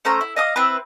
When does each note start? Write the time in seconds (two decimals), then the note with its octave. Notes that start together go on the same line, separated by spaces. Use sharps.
0.05 A3 C#4 C5 A#5
0.21 E4
0.36 D#5 F5 D#6
0.56 C4 E4 B4